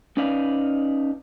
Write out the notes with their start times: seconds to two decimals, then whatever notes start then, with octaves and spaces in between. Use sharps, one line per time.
0.17 C#4 D#4 B4 D5 F5